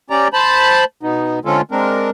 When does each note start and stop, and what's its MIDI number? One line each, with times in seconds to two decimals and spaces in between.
0.10 0.28 61
0.10 0.28 67
0.10 0.28 74
0.10 0.28 82
0.33 0.84 72
0.33 0.84 81
0.33 0.84 83
1.03 1.39 47
1.03 1.39 59
1.03 1.39 63
1.45 1.61 50
1.45 1.61 56
1.45 1.61 60
1.45 1.61 61
1.45 1.61 65
1.45 1.61 69
1.71 2.10 56
1.71 2.10 60
1.71 2.10 62
1.71 2.10 70